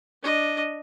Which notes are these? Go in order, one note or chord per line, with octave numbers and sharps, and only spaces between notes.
D4 D#5